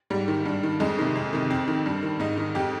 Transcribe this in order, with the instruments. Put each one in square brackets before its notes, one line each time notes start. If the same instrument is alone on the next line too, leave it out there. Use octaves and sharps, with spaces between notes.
[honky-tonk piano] G#2 G3
D#3
G2
D#3
F2 G#3
C3 D#3
F2
C3 D#3
F2 C4
D#3
G2
D#3
G#2 D#4
D#3
F2 G4